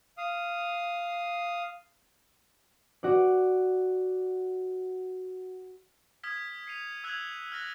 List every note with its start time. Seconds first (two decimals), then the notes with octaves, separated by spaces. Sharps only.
0.18 F5 D#6
3.03 F#4 D5
6.23 D#6 F6 G#6 B6
6.67 C7 C#7 D#7 F7
7.04 E6 F#6 G#6 C#7 F7 F#7
7.52 F6 F#6 A#6